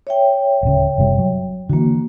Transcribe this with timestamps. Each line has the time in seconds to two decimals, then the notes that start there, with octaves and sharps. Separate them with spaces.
0.07 C#5 E5 G5
0.63 D1 C#3
0.98 F#1 C3 G3
1.19 F#3
1.69 D3 E3 A#3 F#4